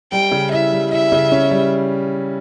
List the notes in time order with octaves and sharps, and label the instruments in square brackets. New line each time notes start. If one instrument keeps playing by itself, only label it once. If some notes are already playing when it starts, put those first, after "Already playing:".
[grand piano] G3 [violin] G5
[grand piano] C#3
[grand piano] E4 [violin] E5
[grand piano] G3
[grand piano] E4 [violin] E5
[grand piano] C#3
C#4
G3